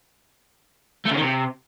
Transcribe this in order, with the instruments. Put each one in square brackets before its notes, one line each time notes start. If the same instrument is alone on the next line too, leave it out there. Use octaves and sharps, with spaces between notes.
[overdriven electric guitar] A3
C#3
D#3
C3